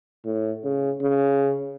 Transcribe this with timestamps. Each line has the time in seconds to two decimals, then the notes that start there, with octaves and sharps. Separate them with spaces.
0.25 A2
0.64 C#3
1.02 C#3